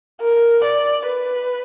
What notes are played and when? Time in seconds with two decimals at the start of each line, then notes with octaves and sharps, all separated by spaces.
0.22 A#4
0.64 D5
1.07 B4